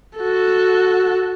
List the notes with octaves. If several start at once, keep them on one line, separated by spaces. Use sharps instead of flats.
F#4 A4